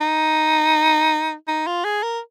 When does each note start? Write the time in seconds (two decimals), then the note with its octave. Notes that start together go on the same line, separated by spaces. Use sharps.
0.01 D#4
1.48 D#4
1.67 F4
1.84 G#4
2.03 A#4